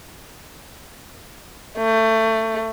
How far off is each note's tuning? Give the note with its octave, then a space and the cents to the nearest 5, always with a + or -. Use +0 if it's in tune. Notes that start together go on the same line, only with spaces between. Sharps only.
A3 +20